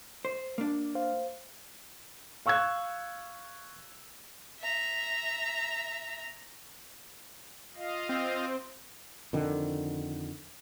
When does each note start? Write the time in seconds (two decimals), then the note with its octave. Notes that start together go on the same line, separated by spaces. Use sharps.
0.25 C5
0.58 A#3 D4
0.95 C5 F5
2.46 F5 C#6 E6 F#6 G#6
4.60 E5 A#5
7.76 F4 D#5 F5
8.09 C4
9.33 F2 D3 D#3